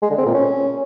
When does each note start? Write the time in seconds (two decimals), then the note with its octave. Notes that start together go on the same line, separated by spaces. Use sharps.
0.02 G#3
0.10 D3
0.18 C4
0.26 A#2
0.34 C#4